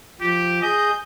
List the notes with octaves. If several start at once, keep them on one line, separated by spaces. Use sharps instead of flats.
F3 G4
G#4 D#5 G6